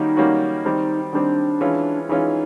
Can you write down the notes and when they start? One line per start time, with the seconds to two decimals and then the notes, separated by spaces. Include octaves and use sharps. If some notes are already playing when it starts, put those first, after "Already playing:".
Already playing: D#3 G3 A#3 C#4 D#4 F#4
0.17 D#3 G3 A#3 C#4 F#4
0.65 D#3 G3 C4
1.13 D#3 G3 C4 D4
1.61 E3 G#3 C#4 F4
2.09 E3 G#3 C#4 D#4 F4